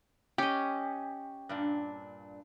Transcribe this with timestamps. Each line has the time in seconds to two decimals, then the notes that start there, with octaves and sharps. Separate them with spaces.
0.38 C#4 G4 D#5
1.49 G2 A#2 D4